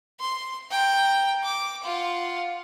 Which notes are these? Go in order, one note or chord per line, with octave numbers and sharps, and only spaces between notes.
C6
G5 A#5
D6
F4 F#5